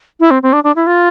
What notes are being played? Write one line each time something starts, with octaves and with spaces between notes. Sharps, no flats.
E4
C4
C4
D4
D4
E4
F4